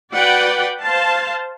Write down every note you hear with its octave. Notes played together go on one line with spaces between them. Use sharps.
F#4 B4 D5 F#5 G5
C5 F5 A5